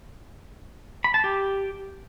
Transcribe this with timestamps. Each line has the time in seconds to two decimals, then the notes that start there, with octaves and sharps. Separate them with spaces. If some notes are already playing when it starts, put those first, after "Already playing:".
1.04 B5
1.14 A5
1.24 G4